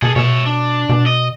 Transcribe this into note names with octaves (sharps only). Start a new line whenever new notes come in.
B2 G#4 A4
B2 C#5 E5
D4
B2
D#5